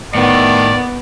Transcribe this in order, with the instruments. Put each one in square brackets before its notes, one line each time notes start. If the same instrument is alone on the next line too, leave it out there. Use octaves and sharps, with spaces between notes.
[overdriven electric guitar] A2 [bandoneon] D#3 [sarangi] B3 [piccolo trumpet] D5